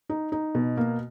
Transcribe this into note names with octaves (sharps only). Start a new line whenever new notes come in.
D#4
D#4
B2
A#3